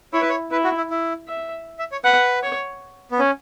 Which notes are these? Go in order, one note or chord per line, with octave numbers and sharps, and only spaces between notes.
E4 C#5
B4
C#5
E4 B4
F#4
E4
E4
E5
E5
C#5
B4 F#5
C#5
B3
C#4